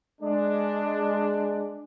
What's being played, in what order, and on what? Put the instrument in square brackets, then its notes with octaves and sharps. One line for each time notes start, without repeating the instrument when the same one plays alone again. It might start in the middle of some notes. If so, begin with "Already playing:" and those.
[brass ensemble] G#3 D4